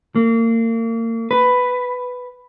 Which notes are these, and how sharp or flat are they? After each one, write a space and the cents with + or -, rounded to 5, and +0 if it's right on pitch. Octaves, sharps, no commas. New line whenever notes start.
A#3 -35
B4 +10